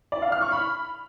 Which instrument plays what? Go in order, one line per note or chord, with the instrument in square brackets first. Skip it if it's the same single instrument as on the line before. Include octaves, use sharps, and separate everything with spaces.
[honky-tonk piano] D5
F5
F6
C#6
B5